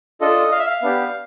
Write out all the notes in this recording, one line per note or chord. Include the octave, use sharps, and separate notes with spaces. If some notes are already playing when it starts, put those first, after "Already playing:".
D4 F4 A4 D#5
F5
E5
F5
B3 D4 G4